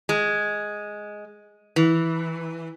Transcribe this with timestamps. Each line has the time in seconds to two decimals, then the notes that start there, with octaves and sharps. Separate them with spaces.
0.09 G#3
1.76 E3